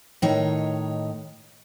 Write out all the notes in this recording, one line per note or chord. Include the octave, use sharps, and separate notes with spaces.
A2 D#3 D#4 C#5